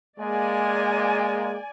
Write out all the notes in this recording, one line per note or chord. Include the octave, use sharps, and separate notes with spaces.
G#3 A#3 D5 G#5